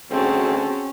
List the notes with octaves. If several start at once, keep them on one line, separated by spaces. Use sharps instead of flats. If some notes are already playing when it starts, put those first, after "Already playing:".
D2 C4 C#4 F#4 G#4 A5